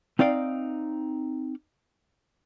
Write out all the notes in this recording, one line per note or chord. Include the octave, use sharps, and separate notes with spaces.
C4 D#4 D5 F5 G5